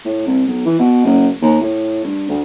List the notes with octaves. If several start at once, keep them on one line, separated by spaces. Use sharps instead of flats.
A2
C2
B1
E3
B2
F#1
D#2
A2
G2
D2